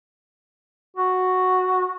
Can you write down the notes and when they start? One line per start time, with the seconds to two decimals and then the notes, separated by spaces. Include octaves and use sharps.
0.97 F#4